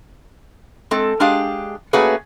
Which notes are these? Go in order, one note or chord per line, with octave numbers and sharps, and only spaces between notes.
G#3 C4 A4
G#3 D4 G4 G#4 F5
A3 A#3 C#4 F#4 G#4 B4